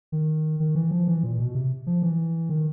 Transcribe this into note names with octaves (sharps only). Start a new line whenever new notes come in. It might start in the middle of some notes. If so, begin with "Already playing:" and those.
D#3
D#3
E3
F3
E3
A#2
B2
C3
F3
E3
D#3